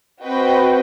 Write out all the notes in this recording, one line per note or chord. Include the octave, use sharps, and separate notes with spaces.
C4 F#4 B4 D#5 G5